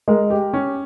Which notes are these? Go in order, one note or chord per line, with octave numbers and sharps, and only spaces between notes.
G#3 A#4
G4
C#4